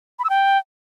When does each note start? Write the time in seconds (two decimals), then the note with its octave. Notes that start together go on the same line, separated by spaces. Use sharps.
0.19 B5
0.24 E6
0.29 G5